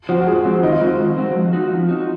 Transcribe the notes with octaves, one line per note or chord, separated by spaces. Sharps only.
F3 C4 F#4
F#4
G#2 G#4
F3 C4 F#4
D#3 D#4
F4
G#3 C4 D#4 F#4
D#3
G#3 C4 F#4
F3
C4 D#4 F#4
F3
C4 D#4 F#4